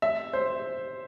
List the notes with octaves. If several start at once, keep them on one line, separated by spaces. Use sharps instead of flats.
E5
C5